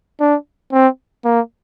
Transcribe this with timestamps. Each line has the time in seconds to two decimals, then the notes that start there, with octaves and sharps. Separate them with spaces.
0.20 D4
0.72 C4
1.25 A#3